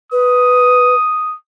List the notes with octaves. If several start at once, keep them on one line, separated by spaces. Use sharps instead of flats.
B4 D#6